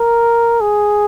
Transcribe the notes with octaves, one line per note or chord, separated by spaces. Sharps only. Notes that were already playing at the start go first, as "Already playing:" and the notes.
Already playing: A#4
G#4